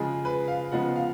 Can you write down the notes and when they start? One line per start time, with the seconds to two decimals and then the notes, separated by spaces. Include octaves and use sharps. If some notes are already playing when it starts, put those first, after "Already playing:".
Already playing: C#3 F3 G#3 G#4
0.25 B4
0.48 F5
0.72 C#3 F3 G#3 B3 F#5
0.96 F5